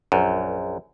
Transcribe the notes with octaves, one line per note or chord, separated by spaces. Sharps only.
A#1 F#2